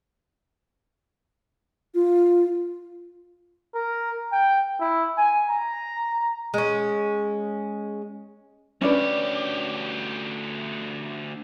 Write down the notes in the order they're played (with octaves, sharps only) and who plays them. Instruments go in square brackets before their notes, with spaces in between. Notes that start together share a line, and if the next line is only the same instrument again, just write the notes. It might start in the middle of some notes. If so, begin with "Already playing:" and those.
[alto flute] F4
[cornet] A#4
G5
E4
G#5
A#5
[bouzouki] G#3 C#4
[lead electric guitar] D2 G4 [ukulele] C#4 D4 B4